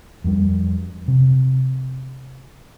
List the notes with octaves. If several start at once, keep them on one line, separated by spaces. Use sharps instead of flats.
F2 G3
C3